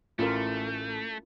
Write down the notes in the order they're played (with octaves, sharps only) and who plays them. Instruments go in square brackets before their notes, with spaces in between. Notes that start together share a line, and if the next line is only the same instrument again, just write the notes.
[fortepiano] A1 [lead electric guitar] A3 [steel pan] F4 A#4